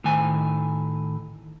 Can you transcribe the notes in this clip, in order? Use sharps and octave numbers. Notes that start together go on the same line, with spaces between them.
A2 D#3 G#5